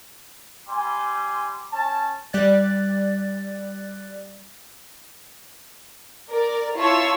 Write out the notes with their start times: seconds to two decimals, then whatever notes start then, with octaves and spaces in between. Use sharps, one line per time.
0.69 G3 G#5 C6
1.72 C#4 A5
2.33 G3 D5 F#6 A6
6.29 A#4 D5
6.75 E4 F4 C#5 A5 C#6 E6